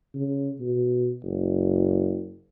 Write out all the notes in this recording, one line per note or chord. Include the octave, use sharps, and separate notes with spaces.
C#3
B2
F#1